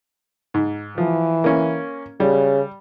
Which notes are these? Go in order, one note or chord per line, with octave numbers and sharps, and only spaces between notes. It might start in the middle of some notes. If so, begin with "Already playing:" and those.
G#2
E3 F3
A#3 C#4
C#3 G3